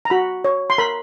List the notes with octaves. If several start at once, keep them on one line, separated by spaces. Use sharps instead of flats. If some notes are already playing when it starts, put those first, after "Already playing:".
A#5
F#4 B5
C#5
C6
A#4 B5